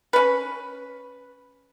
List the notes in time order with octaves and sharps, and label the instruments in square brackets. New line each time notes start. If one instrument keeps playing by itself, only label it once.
[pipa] C#4 B4